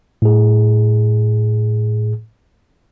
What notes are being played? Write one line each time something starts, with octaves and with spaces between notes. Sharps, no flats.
A2 G#4